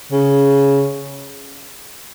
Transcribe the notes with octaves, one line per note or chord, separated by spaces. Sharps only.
C#3